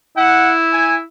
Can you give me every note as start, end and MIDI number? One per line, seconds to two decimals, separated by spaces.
0.17 1.02 64
0.17 0.53 78
0.73 0.95 80